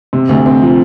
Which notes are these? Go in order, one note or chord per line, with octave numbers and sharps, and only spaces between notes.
C3
D2
C4
F3